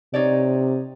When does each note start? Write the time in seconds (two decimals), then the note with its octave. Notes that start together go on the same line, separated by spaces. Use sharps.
0.14 C3 D#4 C#5 D5